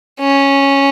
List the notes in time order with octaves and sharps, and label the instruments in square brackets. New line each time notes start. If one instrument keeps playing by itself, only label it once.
[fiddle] C#4